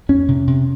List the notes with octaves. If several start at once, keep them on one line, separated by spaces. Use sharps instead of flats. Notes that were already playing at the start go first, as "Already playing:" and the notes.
F2 C#4
C3
C3